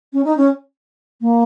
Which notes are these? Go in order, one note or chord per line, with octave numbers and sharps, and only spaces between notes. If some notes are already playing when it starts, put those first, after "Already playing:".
C#4
D#4
C#4
A#3